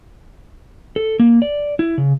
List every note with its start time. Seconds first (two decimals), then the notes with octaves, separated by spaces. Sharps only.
0.96 A4
1.20 A#3
1.42 D5
1.79 E4
1.98 C#3